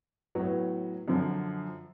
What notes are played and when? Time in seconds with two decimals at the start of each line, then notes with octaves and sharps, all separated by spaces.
0.35 A2 F#3 B3
1.08 F#2 D3 F3